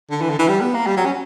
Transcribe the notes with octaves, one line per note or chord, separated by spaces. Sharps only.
D3
E3
D3
E3
G3
B3
A#3
G3
F#3
C#4